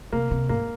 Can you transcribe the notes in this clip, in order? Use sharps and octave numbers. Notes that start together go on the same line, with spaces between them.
C3 A#3
C3
G#2 A#3